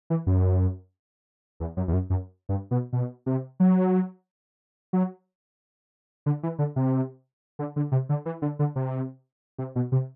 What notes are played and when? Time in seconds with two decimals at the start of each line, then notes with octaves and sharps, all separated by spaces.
0.10 E3
0.27 F#2
1.60 E2
1.77 F#2
1.88 E2
1.93 F#2
2.10 F#2
2.49 G2
2.71 B2
2.93 B2
3.26 C3
3.60 F#3
4.93 F#3
6.26 D3
6.43 E3
6.59 D3
6.76 C3
7.59 D3
7.76 D3
7.92 C3
8.09 D3
8.26 E3
8.42 D3
8.59 D3
8.76 C3
9.59 C3
9.76 B2
9.92 C3